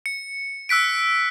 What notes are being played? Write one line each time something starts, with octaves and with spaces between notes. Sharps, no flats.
C#7
E6 F#6 B6 D7